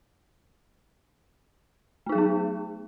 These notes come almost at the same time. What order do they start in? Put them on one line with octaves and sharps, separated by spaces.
A3 D#4 G#4 F#3 B3